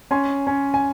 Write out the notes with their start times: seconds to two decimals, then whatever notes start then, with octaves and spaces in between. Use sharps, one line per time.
0.11 C#4 G#5 C6
0.47 C#4
0.74 G#5